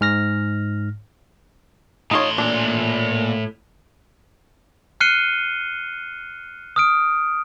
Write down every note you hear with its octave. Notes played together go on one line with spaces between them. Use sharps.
G#2 F6 A#6
A2 D#4 F4 C#5 C6
A#2 D4
F6 F#6 C7 C#7 D#7 G7
D#6 F6 D7